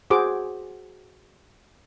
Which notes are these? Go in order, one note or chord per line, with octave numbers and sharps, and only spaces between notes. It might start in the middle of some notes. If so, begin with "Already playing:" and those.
F#4 G#4 C5 D6